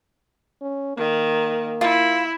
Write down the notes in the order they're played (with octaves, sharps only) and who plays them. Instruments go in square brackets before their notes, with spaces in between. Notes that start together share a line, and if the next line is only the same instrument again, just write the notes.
[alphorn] C#4
[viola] D#3 [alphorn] A#3
[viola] E4 [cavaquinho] F4